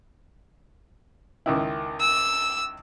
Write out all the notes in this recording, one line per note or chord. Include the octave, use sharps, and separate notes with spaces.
C#2 D#3 E4
E6